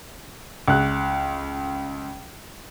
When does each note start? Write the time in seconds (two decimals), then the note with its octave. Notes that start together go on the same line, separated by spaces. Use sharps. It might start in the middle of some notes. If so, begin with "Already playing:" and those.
0.68 C#2 F#6